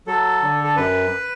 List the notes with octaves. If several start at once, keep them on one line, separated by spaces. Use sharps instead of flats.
F#3 A4
D3
A4
F#2 B4